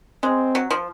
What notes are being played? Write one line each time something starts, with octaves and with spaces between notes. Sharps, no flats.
G#3 C4
F#3
F3